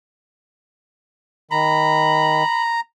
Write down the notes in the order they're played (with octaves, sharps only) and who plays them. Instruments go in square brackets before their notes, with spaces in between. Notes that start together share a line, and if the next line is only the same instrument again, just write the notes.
[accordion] D#3 [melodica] A#5 [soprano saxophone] B5